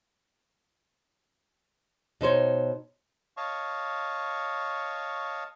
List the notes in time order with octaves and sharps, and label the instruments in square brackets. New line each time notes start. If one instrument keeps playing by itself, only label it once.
[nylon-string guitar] B2 D#4 C5 C#5
[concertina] C#5 D#5 F5 A5 C#6